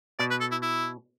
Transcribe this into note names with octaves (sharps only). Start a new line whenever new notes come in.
B2 D5
B4
A4
E4
E4